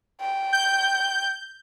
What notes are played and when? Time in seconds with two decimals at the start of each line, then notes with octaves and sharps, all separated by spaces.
0.21 G5
0.53 G6